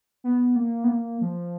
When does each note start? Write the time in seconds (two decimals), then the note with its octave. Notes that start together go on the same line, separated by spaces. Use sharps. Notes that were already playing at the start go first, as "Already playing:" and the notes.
0.24 B3
0.56 A#3
0.84 B3
0.88 A#3
1.21 F3